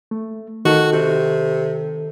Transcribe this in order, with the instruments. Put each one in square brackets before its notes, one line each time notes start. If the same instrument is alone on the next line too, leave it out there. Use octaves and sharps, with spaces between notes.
[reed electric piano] A3
[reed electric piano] D#3 A4 [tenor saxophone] F#4
[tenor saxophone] C3